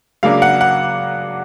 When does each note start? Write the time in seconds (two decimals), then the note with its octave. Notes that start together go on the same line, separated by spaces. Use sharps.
0.23 C#3 F#3 A#3 D4 F5
0.42 F#5
0.61 F#5